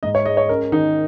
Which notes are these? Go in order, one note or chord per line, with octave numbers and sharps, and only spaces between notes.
G#2 D#5
C#5
G#3 D#5
C#5
C#4 A#4
D#3 D#4